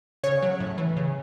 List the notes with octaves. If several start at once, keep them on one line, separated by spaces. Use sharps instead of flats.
C#3 C#5
F#3
A2
E3
C#3